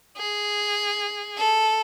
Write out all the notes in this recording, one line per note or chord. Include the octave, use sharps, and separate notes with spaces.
G#4
A4